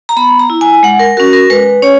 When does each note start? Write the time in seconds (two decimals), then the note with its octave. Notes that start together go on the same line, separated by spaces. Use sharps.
0.09 A#5
0.17 B3 B5
0.39 A#5
0.50 E4
0.61 G#5
0.83 G#3 F#5
0.99 A#4
1.17 C#4 F#4 A#4
1.33 A#4
1.50 G#3 B4
1.82 C#4 C#5